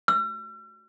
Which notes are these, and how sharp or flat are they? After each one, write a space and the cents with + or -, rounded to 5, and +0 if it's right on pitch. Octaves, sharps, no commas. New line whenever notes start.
E6 +45